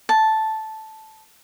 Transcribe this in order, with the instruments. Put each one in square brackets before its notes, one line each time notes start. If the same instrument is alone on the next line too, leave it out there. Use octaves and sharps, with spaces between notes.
[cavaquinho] A5